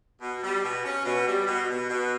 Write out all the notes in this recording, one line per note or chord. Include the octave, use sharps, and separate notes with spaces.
B2
G3
B2
C#4
B2
G3
B2
B2
B2